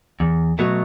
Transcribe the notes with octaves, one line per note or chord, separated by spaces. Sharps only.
E2
B2 F#3 A3